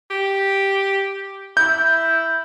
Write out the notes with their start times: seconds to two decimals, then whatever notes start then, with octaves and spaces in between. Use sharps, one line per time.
0.10 G4
1.57 E4 G6